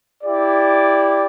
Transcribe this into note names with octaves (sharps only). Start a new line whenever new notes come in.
E4 G4 D5